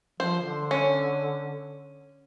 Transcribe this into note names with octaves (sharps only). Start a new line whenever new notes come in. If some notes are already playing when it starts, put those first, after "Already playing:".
F3 C5
D3
C#4